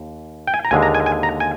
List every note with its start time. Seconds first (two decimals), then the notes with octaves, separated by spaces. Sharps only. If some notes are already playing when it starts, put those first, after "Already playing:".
Already playing: D#2
0.47 G5
0.54 G#5
0.65 A#5
0.71 D#2 D3 G#3 G#5
0.82 A#5
0.95 G#5
1.06 G#5
1.23 A#5
1.40 G#5